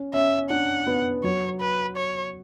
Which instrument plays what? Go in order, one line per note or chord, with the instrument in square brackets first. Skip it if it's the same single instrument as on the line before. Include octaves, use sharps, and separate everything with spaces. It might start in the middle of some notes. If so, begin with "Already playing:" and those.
Already playing: [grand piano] C#4
[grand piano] C#4 [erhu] E5
[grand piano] D4 [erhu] F#5
[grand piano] B3
[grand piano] F#3 [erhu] C#5
[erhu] B4
C#5